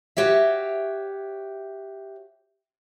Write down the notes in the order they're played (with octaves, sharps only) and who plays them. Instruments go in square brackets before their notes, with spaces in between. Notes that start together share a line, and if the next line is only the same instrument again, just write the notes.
[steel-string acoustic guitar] F#4 G4 C#5 E5